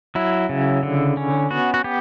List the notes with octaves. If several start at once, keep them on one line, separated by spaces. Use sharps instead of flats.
F#3 E4
C#3
D3
C#4
B3 F#4
F#4
B3 G4